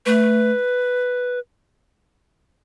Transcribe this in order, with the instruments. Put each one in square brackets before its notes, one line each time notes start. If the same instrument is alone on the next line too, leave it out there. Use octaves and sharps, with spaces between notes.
[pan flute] A3 [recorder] B4